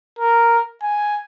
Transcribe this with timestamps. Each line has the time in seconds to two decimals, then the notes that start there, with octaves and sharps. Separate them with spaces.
0.19 A#4
0.83 G#5